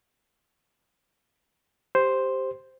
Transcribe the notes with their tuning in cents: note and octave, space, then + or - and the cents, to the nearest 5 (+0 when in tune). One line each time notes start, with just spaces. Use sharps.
G4 +0 C5 +0